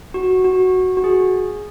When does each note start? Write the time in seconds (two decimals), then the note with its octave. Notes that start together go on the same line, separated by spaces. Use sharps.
0.14 F#4
0.44 F#4
0.97 F#4
1.04 G#4